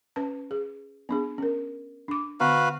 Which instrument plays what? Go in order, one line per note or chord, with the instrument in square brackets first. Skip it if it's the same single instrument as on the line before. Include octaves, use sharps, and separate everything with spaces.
[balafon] C#4 B4 A5
G#4
B3 D4 G#4
C#4 A#4
D4 D6
[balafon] D3 B3 A#5 [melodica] F#4 B4 F5